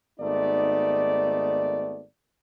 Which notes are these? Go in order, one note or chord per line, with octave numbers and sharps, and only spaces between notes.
G#1 A3 B3 D#4 D5